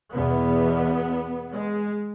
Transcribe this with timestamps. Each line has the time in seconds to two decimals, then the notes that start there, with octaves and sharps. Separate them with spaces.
0.13 E2 B2 B3
1.53 G#3